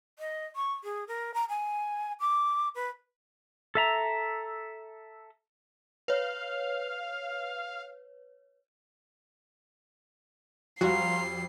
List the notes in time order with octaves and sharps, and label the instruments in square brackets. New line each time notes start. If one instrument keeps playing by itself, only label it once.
[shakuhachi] D#5
C#6
G#4
A#4
A#5
G#5
D6
B4
[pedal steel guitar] A4 E5 A#5
[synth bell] B4 C#5 [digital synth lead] F5
[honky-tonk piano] F2 G3 [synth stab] F#4 [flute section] F5 A#5 C6 [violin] C7